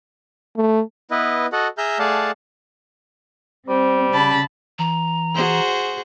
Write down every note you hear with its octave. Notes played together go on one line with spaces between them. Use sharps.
A3
B3 E4 B4 D#5
F#4 A4 D#5 F#5
G#4 E5 A#5 F6 G6
A3 G#4 D5 F5 F#5 A5
G3 C4 C5
C#3 A5 B5
E3 A#5
F#4 G#4 C5